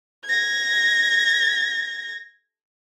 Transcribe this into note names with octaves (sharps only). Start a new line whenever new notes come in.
G#6 A#6